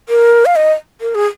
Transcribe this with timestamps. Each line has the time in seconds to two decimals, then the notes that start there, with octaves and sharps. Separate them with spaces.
0.09 A#4
0.46 F5
0.56 D#5
1.01 A#4
1.15 G#4